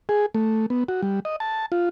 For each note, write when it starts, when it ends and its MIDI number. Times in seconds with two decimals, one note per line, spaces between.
0.09 0.26 68
0.35 0.66 57
0.70 0.84 59
0.88 1.01 66
1.02 1.20 55
1.25 1.36 75
1.40 1.66 81
1.72 1.89 65